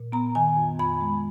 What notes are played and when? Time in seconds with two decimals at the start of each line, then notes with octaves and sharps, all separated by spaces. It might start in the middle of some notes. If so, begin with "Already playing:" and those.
Already playing: A#2
0.12 B3 A#5
0.35 D#3 G#5
0.57 F2
0.79 F2 B5
1.01 G#3